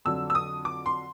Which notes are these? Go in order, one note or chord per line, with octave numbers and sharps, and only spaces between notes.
F2 D3 F#3 E6
E6
D#6
D6
C6